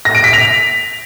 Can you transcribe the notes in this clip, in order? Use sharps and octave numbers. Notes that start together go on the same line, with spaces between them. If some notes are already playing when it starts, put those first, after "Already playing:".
A#6
D7
B6
F7